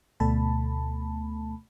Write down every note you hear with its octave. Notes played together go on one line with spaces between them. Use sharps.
D2 B2 A3 A5 B5